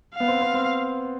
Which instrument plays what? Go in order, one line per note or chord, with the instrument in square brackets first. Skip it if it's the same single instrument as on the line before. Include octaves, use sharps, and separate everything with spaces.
[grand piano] B3 [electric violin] F5
[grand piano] C4
C4
C4